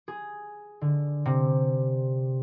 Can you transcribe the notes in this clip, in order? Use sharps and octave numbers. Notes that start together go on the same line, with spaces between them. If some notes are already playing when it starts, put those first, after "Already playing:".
G#4
D3
C3